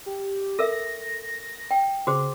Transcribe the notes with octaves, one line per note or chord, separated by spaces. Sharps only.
G4
A4 A#4 E5 A#6
G5
C#3 F#4 G#4 C5